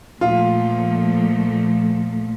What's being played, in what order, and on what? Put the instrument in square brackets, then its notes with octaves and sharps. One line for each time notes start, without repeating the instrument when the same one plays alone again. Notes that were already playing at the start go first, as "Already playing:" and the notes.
[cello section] A#2 F3 A3 [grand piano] F4